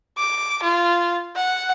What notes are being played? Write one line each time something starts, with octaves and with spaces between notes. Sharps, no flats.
D6
F4
F#5